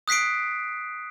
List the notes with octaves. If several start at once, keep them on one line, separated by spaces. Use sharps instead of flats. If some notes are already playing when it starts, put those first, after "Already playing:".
D#6 F#6 B6 C7 D7